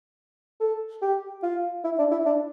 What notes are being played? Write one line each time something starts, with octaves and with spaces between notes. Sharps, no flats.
A4
G4
F4
E4
D4
E4
D4